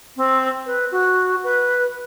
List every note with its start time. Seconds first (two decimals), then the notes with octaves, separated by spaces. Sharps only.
0.16 C4
0.66 B4
0.91 F#4
1.44 B4